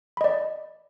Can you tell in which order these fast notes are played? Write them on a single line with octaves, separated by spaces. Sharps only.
B5 D#5 D5